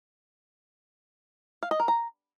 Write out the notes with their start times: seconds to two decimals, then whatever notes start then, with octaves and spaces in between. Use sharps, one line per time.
1.63 F5
1.71 D#5
1.80 A#4
1.88 A#5